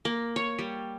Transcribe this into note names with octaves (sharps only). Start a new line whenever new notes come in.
A#3
C#5
G3